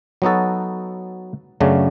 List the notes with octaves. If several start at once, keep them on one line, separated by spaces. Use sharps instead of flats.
F#3 B3 D#4 F#4 A4
F#2 C#3 F#3 A3 D4